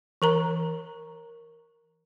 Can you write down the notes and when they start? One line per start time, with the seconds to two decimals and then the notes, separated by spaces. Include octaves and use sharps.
0.22 E3 A#4 A#5